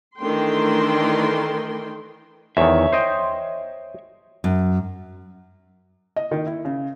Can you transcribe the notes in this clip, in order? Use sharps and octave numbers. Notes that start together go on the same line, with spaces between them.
D#3 E3 A3 D4 G5 C6
E2 D#3 C#5 E5
C5 D#5 G5
F#2
D#5
D#3
E4
C#3